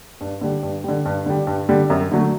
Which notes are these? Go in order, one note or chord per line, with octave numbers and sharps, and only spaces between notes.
G2
D3 G3
G2
D3 G3
G2
D3 G3
G2
D3 G3
F#2
D3 F#3 A3